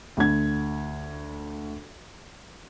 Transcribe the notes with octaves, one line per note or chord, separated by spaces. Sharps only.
D2 G#6